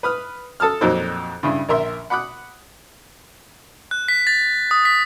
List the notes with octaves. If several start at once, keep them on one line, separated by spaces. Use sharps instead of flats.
B4 D#6 F6
A4 A5 D#6 F6
F2 A#2 F#3 D#4 A4 C5
G2 C#3 E4
A#1 A#4 E5 C6
F#5 B5 D6 D#6 F#6
F#6
B6
A6
D#6
B6